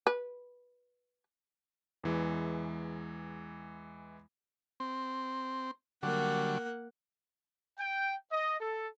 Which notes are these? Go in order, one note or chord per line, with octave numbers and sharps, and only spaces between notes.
B4
E2 E3 G#3
C4
D3 F#3 G3 A#3 F#5
G5
D#5
A4